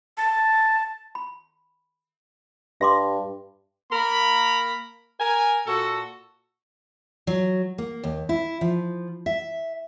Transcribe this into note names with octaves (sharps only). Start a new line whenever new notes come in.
A5
B5
G2 E5 C6 D6
A#3 A#4 A#5 B5
A#4 G#5
A#2 F#4 A4
F#3
A#3
D#2
E4
F3
E5